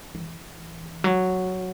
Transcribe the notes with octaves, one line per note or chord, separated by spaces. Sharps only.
E3
F#3